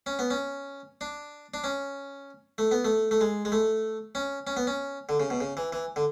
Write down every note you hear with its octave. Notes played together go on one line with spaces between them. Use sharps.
C#4
B3
C#4
D4
D4
C#4
A3
B3
A3
A3
G#3
G#3
A3
C#4
C#4
B3
C#4
D3
C#3
B2
C#3
E3
E3
D3